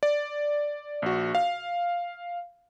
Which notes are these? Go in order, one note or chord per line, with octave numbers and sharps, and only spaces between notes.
D5
A#1 F#4
F5